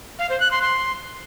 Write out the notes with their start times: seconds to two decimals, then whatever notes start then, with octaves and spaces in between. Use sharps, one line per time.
0.19 F5
0.30 C5
0.40 F#6
0.51 C6
0.62 C6